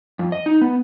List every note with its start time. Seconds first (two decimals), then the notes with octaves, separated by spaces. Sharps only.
0.19 F2
0.32 D#5
0.46 D#4
0.61 B3